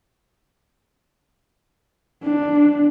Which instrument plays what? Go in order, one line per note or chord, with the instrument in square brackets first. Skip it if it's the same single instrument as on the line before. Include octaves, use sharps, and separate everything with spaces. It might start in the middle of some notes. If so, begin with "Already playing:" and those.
[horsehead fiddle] D4